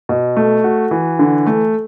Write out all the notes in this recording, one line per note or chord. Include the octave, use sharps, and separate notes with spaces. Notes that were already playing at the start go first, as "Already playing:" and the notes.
B2
A3
F#4
E3
D3
A3